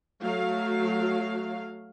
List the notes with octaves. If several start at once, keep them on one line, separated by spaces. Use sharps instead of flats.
F#3 A3 F5